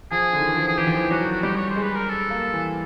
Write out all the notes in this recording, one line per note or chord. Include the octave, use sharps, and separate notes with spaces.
F3 G#4
D3
D#3
E3
F3
G#4
E3 G4
F3
E3
F#3 F#4
F#4
G3 G4
C#5
C5
G#3
B4
A#4
A4
A#3
E3